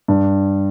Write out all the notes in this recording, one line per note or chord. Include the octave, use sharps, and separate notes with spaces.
G2